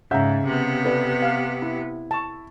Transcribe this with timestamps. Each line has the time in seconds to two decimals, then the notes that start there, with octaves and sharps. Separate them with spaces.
0.11 G#2 C#3 E5 F#5 A#5 G6
0.46 C3 B3
0.85 A4 B4 D5
1.22 F5
1.62 E4
2.11 A5 C#6